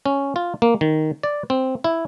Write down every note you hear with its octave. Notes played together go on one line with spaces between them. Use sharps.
C#4
F4
A#3
D#3
D5
C4
E4